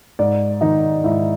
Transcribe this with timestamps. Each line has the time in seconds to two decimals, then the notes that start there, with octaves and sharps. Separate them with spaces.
0.19 G#2 D5
0.61 D#3 D#4 D#5
1.04 G#2 E4 E5